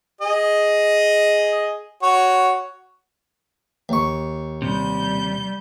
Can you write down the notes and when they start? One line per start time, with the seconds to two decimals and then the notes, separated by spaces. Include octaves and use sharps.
0.21 G#4 D#5
2.02 F#4 C#5
3.89 D#2 C#6
4.62 C3 G3 G6